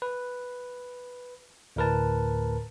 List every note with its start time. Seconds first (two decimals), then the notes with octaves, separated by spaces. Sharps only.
0.02 B4
1.76 D2 A2 A#4 B4 A5